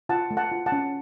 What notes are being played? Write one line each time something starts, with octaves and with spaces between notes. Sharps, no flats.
F4 F#5 A5
A3
F#5 A5
F4
F#5 A5
C#4